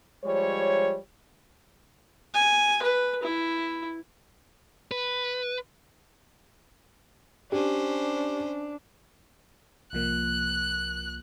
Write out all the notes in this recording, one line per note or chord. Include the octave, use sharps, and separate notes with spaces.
F3 G3 G#3 C#5
G#5
B4
E4
B4
C#4 D4 G4 C5
C2 F3 A#3 F#6